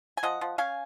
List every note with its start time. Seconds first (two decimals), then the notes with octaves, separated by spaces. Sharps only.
0.17 G#5
0.23 F3 D#5 F#5
0.41 F3
0.58 C#4 F5 G#5